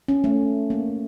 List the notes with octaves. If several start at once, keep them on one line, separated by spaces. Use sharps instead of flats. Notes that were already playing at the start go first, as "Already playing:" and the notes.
C#4
A3
A#3